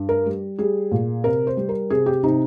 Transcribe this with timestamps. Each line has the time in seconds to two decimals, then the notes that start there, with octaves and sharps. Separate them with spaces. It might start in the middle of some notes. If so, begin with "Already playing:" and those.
Already playing: G2
0.09 A#4
0.26 G3
0.58 G3 G#4
0.92 A#2
1.24 C3 A#4
1.47 C5
1.57 G3
1.69 A#4
1.90 C3 G#4
2.06 G4
2.23 C3 D#4